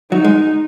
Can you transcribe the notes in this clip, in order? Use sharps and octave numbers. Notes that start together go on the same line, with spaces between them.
F#3 D#4
G#3